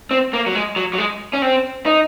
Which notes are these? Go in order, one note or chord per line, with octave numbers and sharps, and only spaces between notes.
C4
A#3
F#3
G#3
F#3
F#3
G#3
C#4
C4
D#4